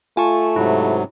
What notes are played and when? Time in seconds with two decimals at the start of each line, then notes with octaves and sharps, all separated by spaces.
0.17 A3 F4 G#5 A5 C#6
0.56 G#2 C3 F#3 E4